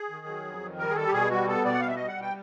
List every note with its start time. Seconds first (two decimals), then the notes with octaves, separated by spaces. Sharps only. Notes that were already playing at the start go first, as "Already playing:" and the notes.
Already playing: G#4
0.10 D#3
0.26 F#3
0.44 F2
0.61 D#3
0.79 G3 A#4
0.90 G#4
0.96 G3 A4
1.07 G4
1.13 B2 G#4
1.31 G3 F#4
1.48 B3 A4
1.65 B2 D5
1.74 F#5
1.80 G3 F5
1.88 E5
1.96 G3 D#5
2.08 F#5
2.17 B2 G5